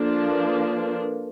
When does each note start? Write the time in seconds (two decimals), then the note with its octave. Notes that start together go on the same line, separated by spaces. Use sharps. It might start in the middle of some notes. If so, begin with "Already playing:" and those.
Already playing: F3 A#3 D4 A4
0.09 A#4
0.31 B4